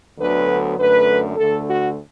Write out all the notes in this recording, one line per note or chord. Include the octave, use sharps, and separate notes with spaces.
D2 D3 F#3 B3 B4
F#2 D3 A3 B4
D2 D3 A3 A4
F#4